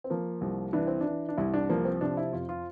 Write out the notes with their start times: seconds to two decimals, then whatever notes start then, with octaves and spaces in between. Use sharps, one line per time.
0.04 C4
0.10 F3 A#3
0.41 C2
0.73 E3 D4
0.87 C4
1.01 D4
1.06 E3
1.29 D4
1.37 C2 E4
1.54 D4
1.70 F3 A#3
1.85 C4
2.01 C3 D4
2.17 E4
2.33 F2 F4
2.49 F4